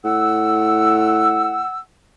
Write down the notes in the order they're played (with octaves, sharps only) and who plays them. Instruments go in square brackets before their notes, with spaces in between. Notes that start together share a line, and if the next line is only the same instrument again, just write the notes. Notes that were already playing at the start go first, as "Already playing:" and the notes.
[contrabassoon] A2 [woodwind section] F#5 E6